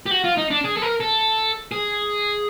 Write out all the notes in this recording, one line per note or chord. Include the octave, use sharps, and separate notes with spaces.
G4
F#4
F4
D#4
D4
G#4
A4
A#4
A4
G#4